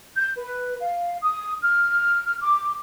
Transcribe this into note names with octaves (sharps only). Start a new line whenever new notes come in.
G6
B4
F5
D#6
F6
D6